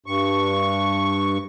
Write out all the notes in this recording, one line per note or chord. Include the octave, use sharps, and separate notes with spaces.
G2 C#6